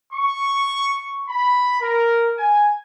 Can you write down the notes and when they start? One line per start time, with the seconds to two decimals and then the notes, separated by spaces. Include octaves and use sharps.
0.13 C#6
1.28 B5
1.81 A#4
2.38 G#5